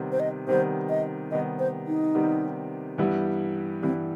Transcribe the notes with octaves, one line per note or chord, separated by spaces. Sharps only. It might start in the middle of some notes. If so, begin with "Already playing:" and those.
Already playing: C3 D#3 G3 B3
C5
D#5
C3 D#3 G3 B3 C5
D#5
C3 D#3 G3 B3 D#5
C5
D#4
C3 D#3 G3 B3
G2 E3 G3 B3 E4
G2 E3 G3 B3 C4 E4